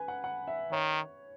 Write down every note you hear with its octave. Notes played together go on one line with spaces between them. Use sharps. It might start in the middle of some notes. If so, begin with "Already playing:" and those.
Already playing: B4 G#5
F#5
F#5
E5
D#3 C#5